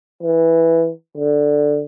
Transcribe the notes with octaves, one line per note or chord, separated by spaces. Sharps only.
E3
D3